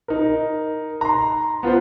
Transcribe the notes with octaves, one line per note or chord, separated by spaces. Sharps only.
D#4 A#4
A#5 C6
B3 F4 B4 C5